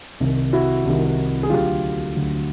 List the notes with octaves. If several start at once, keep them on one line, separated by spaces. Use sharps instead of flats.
C2 C3 D#3
E4 F#4
C2 C3 D#3
G#4
D2 D3 F#3 F4 G4
D2 D3 F#3